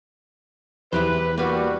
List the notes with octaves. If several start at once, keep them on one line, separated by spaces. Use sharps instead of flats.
E2 E4 G4 B4 C5
G3 A#3 F#4 B4